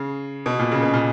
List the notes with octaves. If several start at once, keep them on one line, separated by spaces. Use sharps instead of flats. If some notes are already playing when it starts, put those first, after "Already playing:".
Already playing: C#3
B2
A#2
C#3
B2
A#2